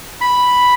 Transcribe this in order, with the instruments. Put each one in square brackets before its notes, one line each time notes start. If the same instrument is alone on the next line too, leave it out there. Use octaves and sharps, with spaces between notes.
[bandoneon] B5